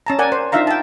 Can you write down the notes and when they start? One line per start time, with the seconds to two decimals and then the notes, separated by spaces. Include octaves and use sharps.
0.06 C#4 A5 A#5
0.19 A#4 D5 F#5 G#5
0.32 C5
0.52 D4 D#4 F4 E5 F5 A#5
0.67 G5 A5